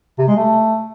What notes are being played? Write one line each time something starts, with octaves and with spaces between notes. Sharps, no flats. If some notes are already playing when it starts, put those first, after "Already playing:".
C3
G#3
A3